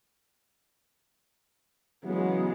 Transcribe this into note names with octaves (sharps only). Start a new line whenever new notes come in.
C#3 E3 F#3 G#3 B3